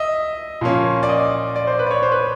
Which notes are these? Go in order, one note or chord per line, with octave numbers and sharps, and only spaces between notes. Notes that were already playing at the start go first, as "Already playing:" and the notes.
Already playing: D#5 E5
A#2 F3 A#3 C#4
D5
D#5
D5
C5
B4
D5
C#5
C5
B4